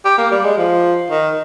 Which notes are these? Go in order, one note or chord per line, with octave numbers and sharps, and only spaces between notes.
G4
A#3
G3
G#3
F3
D#3